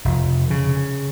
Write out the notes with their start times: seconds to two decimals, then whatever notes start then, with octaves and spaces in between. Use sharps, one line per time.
0.05 F1
0.50 C#3